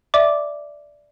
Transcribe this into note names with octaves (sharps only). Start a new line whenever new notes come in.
D5 E5 D6